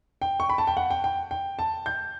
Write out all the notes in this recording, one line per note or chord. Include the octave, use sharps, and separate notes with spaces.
G5
C#6
B5
A5
G5
F#5
G5
G5
G5
A5
G6